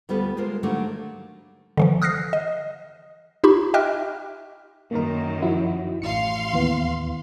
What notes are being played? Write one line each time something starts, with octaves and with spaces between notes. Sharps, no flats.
D2 G3 B3 F4 A4
G#3 A#3 F4 A#4 C5
D3 D#3 F#3 G3 A3 A#3
D3 E3 F3
D#6 F6 F#6 A#6 C7
D#5
D#4 F4 G4 B5 C#6
D#5 E5 G5 D6 F6 F#6
F#2 D#3 A#3 A#4
F3 E4 F#4
A1 F5 C6 C#7
D#2 E3 B3